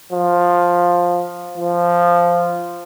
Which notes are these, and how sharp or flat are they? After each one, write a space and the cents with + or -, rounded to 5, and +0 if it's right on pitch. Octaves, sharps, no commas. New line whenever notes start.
F3 +10
F3 -5